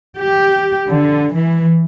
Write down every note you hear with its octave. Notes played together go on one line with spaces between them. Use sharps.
G4
D3
E3